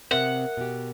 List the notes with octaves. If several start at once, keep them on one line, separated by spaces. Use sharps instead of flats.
C3 C4 A#4 E5 F#5 F#6
B2 G4